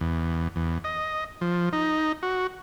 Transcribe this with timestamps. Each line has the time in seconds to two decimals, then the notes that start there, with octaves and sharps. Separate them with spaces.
0.01 E2
0.56 E2
0.84 D#5
1.41 F3
1.73 D#4
2.23 F#4